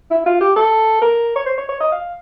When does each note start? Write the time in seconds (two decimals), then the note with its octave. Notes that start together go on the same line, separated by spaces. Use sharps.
0.11 E4
0.26 F4
0.41 G4
0.56 A4
1.02 A#4
1.36 C#5
1.46 C5
1.58 C#5
1.69 C#5
1.81 D#5
1.92 F5